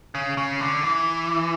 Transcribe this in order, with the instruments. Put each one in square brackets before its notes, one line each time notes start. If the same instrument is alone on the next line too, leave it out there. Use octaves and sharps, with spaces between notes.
[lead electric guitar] C#3
C#3
D3
E3